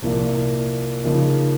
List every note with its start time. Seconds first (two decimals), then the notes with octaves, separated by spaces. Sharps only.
0.03 C2 A#2 F3 A#3
1.04 C#3 F3 A#3 D#4